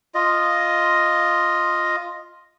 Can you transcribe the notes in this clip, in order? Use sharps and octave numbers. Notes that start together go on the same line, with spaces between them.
F4 D#5